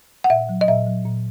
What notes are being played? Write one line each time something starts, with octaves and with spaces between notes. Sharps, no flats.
F#5
A#2 E5
F#3
D#5
A#2 E5
F#3
A#2